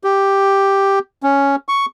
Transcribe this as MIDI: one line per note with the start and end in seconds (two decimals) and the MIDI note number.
0.04 0.99 67
1.23 1.56 61
1.69 1.86 85